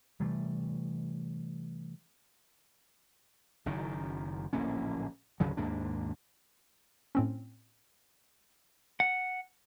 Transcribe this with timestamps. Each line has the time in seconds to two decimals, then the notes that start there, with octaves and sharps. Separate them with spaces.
0.20 C3 E3 G3 A3
3.66 F#1 F#2 D#3
4.53 D1 A#1 A#3 C#4
5.40 G#1 D2 C#3 F#3
5.57 D#2 G#2 A#3 D4
7.15 A2 C4 C#4
9.00 F#5